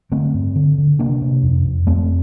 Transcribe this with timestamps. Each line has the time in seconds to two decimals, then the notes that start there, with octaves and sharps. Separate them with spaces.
0.12 D3 A3 C4
0.34 G2
0.56 D3
0.78 D3
0.99 C3 A#3 D4
1.22 C3
1.43 F2
1.65 F2
1.87 F2 A3 C4